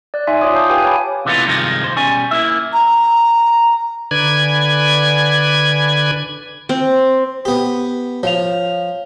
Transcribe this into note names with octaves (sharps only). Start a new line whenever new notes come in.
D5 F#6
D#4 E5 G#5 C6
F4 C#5 D6 D#6
F5 A5 D#6 G6
G4 B4 F5 G5 G#5
C#5 F#5 G#5 A5 B5 D6
C3 E3 G#3 A3 B3 F4
G2 C3 D#3 F3 G#3
D#2 B2 C5
B2 G3 C#4 G#5
A#3 E4 E5
A#5
D3 B4 D5 G#5 G#6
C4
B3 G4
F3 C#5 F5 F7